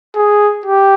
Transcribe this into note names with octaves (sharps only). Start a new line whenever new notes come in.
G#4
G4